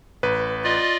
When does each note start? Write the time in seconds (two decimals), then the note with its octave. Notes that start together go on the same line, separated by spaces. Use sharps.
0.23 A1 B4
0.64 F4 D5 D#5